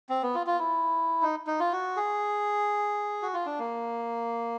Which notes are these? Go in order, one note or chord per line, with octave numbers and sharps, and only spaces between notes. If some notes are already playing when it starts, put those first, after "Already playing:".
C4
B3
F4
F4
E4
D#4
D#4
F4
F#4
G#4
F#4
F4
D4
A#3